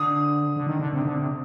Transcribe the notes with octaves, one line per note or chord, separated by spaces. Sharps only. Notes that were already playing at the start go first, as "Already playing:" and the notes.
Already playing: D3 D#6
D3
D#3
D3
C3
D3
C3